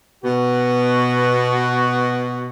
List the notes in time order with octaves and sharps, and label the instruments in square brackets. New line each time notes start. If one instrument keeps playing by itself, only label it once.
[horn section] B2 F#4